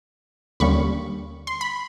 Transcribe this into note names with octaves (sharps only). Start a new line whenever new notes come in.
D#2 D3 G3 A#3 C#4 B5 C#6
C6
B5